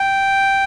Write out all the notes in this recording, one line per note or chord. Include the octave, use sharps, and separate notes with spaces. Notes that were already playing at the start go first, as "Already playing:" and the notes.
Already playing: G5